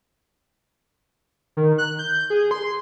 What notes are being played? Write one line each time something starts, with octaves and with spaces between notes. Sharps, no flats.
D#3
F#6
G6
G#4
C6